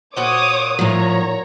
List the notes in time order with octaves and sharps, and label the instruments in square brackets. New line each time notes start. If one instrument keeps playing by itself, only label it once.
[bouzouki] A#2 F#4 C5 [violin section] C#5 D6 D#6
[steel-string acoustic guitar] A2 F3 [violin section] C#5 A#5